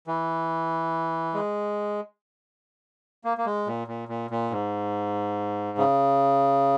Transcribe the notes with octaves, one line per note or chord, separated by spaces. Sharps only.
E3
G#3
A#3
A#3
G#3
A#2
A#2
A#2
A#2
G#2
C#3